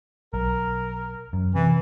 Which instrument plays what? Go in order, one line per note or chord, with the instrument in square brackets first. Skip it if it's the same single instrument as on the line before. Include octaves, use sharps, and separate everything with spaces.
[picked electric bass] B1 [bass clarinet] A#4
[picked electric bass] F#2
[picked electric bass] C3 [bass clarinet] E3